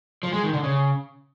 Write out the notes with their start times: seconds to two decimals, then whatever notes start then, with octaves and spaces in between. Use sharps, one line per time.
0.23 F3
0.33 G#3
0.43 D#3
0.54 D3
0.64 C#3